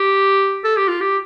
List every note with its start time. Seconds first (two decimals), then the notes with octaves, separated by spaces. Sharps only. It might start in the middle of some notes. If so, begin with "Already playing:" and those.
Already playing: G4
0.64 A4
0.77 G4
0.88 F4
1.01 G4